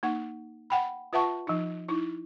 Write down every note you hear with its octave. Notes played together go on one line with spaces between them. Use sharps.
A#3 D#4 F#5
F#5 G5 B5
F4 B4 E5 F#5 A5 C#6
F3 D#4
D#4 E4